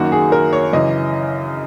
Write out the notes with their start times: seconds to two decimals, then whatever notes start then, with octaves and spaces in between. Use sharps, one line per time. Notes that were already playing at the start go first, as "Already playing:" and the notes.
Already playing: F#1 F#2 D#3 A#3 F#4
0.12 G#4
0.32 A#4
0.53 C#5
0.73 F#2 C#3 E3 D#5